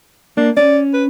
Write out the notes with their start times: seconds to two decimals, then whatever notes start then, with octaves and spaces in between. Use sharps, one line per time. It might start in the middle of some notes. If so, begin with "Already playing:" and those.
0.37 A#3 D4
0.57 C#4 D5
0.93 B4